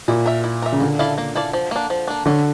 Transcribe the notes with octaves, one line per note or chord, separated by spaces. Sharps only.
A#2 E4
A#4 E5
E4
A#4 E5
C#3
D3 A#3
E4 A4 D5 F5
A#3
E4 A4 D5 F5
F3
A#3 D4
F3
A#3 D4
D3 C#4